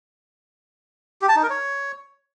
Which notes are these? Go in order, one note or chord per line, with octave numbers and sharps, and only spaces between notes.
G4
A5
D#4
A#4
C#5